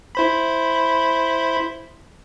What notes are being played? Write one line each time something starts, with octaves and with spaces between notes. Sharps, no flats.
E4 C5 B5